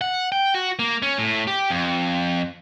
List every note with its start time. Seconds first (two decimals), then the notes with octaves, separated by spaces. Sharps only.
0.01 F#5
0.32 G5
0.54 F#4
0.79 A#3
1.02 C#4
1.18 A2
1.47 G4
1.70 F2